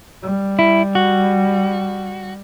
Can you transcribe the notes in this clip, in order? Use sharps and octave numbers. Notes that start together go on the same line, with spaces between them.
G3
E4
F#4